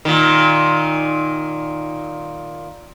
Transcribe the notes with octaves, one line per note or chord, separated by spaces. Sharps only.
A#2 D#3